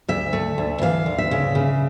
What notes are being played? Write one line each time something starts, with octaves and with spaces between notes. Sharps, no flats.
D2 E5
A3
D2
E3 F5
D2
E5
C#3
C#3